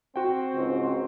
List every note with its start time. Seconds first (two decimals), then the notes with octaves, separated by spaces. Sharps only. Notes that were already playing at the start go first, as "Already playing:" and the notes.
0.16 C4 F#4 G5
0.54 C#2 G#2